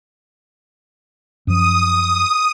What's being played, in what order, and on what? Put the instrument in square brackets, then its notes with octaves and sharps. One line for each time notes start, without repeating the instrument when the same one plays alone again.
[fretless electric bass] F#2 F3 [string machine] D#6